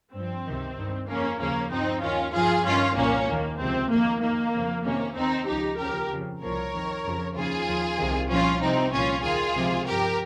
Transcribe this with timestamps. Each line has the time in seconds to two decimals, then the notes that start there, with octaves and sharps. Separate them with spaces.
0.14 G2 F3 C4
0.46 C#2 C3 D#3
0.77 G2 D#3
1.09 F2 C#3 F3 A#3 C#4
1.40 D#2 C#3 F3 A#3 C#4
1.71 G2 F3 C4 D#4
2.02 D#2 D#3 C#4 F4
2.34 G2 F3 F4 G#4
2.65 G2 D#3 C#4 F4
2.96 C2 A#2 F3 A#3 C#4
3.28 D#2 D#3 A#3
3.59 C#2 C3 F3 C4
3.91 F2 D#3 A#3
4.22 F2 D#3 A#3
4.53 F2 C#3 F3
4.84 F2 C3 D#3 A#3 C#4
5.16 D#2 D#3 C4 D#4
5.47 C#2 C#3 F3 D#4 G4
5.79 D#2 C#3 F3 G4 A#4
6.10 F2 C#3 F3
6.42 C2 A#2 F3 A#4 C#5
6.73 F2 D#3
7.04 F2 C#3 F3
7.35 D#2 C#3 F3 F4 G#4
7.67 D#2 C#3 F3
7.98 C2 C3 D#3
8.29 C2 A#2 F3 C#4 F4
8.61 C2 C3 F3 C4 D#4
8.92 C2 A#2 F3 C#4 F4
9.23 D#2 D#3 F4 G#4
9.55 C#2 C3 F3
9.86 G2 F3 G4 A#4